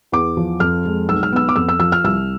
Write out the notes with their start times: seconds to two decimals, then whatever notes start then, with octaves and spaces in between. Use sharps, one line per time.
0.12 E2 D6
0.37 F3
0.60 F2 F6
0.85 G#3
1.09 B1 E6
1.23 F6
1.32 B3 E6
1.49 D6
1.56 F2 E6
1.69 E6
1.80 F3 E6
1.92 F6
2.04 C2 E6